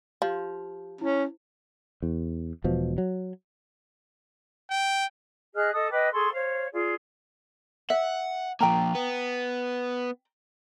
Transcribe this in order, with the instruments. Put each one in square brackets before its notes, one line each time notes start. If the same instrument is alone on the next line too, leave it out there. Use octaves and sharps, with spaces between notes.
[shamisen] F3 [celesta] G4
[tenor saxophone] C#4 [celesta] E4
[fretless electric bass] E2
E1 B2 F3
F#3
[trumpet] G5
[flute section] G#4 D#5 F6 F#6
A4 D#5 D#6
B4 D#5 G5 D6
G#4 A4 C6 C#6
C5 C#5 F5
F4 G#4 D5
[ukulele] E5 [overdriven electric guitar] F#5
[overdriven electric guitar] F3 A#3 [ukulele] G5 A#5
[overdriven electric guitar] B3